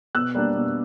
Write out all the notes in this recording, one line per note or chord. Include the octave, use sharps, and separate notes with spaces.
B2 E6 F#6
G3 A#3 D4
B2